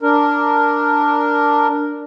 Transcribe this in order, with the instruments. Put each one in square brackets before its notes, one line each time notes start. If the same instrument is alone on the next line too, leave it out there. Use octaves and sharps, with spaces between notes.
[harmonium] D4 A#4